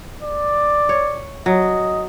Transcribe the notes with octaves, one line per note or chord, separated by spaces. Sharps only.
D5
C#5
F#3 D#5